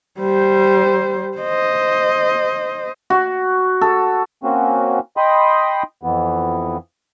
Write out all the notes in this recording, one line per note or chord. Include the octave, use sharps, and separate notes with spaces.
G3 C5
C5 D#5
F#4
A4
A#3 C4 C#4 F#4
D#5 G5 B5 C6 D#6
F2 E3 B3